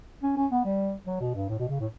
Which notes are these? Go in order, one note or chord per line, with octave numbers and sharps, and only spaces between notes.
C#4
C#4
B3
G3
F#3
B2
G2
A2
B2
C#3
A2